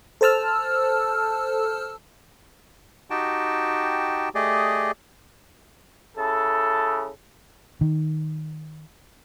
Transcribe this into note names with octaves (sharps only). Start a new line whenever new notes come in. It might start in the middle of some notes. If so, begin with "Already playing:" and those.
A4 C5 A5 E6 F6
D#4 F#4 G4 G5 A5
A3 G4 G#4 D5 D#5
C#3 E4 A4
D#3